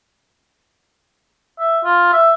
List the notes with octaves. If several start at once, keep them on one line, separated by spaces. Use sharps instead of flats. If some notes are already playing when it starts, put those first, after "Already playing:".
E5
F4
E5